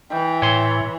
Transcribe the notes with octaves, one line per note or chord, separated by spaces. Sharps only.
E3 G5
A2 C#5 C6